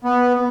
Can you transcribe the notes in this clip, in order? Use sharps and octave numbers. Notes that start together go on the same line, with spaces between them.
B3